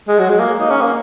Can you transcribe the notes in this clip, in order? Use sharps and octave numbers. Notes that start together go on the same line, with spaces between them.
G#3
F#3
G#3
A#3
D#4
C#4
A#3